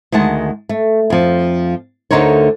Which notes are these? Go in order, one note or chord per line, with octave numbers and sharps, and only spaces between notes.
D2 D#3 G#3 F#5 A5
A3
F2 F3
D2 D3 D#4 A#4 C5 C#5